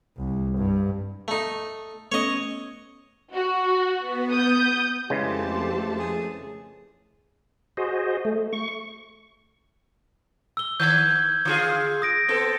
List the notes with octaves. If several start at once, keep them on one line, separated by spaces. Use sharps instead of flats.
C2
G2
A3 D#4
A3 B3 C#4 C#5 D#5
F#4
B3
D#6 G6
F2 C#3 E3 G#3 A3 G4 C5 A5
G#4
F#4 G#4 C5 D#5
A3
C#6
E6 G7
D#3 G6 G#6
D3 F4 G#4
D#6 A#6 D7
B3 C4 A4